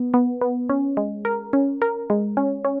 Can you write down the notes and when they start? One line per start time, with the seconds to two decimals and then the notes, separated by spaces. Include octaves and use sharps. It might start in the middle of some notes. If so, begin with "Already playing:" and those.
Already playing: B3
0.14 B3
0.41 B3
0.69 C#4
0.97 G#3
1.25 A#4
1.53 C#4
1.82 A#4
2.10 G#3
2.37 C#4
2.65 C#4